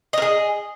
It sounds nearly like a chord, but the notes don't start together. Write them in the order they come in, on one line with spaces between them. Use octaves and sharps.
D#5 A#4 G#4